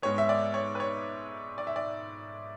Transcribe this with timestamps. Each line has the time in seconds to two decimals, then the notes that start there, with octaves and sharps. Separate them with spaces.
0.02 G#2 G#3 B3 C#5
0.18 E5
0.29 D5
0.54 C#5
0.75 B4
0.80 C#5
1.58 D5
1.67 E5
1.76 D5